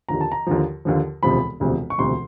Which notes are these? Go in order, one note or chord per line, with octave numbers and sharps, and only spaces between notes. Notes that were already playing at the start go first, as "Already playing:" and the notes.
D#2 D3 F3 A#5
A5
A#5
D#2 D3 F3
D#2 D3 F3
E1 D2 C3 F3 B5
E1 D2 C3 F3
C#6
E1 D2 C3 F3 C6